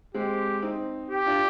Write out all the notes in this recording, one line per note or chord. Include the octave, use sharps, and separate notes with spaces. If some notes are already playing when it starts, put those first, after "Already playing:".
G#3 C4 G4
C4 D#4
G4
D4 F4